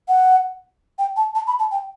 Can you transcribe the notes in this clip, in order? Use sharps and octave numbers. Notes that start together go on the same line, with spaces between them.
F#5
G5
A5
A5
B5
A5
G5